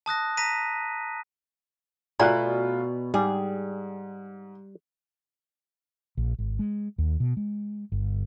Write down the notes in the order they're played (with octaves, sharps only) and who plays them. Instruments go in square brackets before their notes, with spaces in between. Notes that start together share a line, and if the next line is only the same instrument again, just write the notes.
[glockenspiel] A5 D#6 F#6 A#6
A#5 A#6 B6 D#7
[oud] B2 [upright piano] A3 F4 F#6 [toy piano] D5 G#5 A#5
[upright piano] G#2 [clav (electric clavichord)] G3 [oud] G#4
[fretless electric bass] A#1
G#1
G#3
D#2
B2
G#3
G1